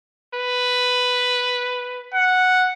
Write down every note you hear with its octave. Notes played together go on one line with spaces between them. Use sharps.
B4
F#5